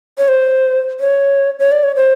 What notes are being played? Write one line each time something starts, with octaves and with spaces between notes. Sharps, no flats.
C#5
C5
C#5
C#5
D5
C#5
C5